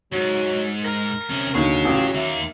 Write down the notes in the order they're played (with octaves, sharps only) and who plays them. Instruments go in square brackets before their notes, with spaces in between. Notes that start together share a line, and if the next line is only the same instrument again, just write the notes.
[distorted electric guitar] G#2 [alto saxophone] F#3
[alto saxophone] A#4 [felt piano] A#6
[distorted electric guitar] C3 C#4
[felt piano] D#2 D3 [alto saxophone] F#3 [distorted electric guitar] G#4 C#5
[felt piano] A1 F4
[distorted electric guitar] D#2 A#3 [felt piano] E5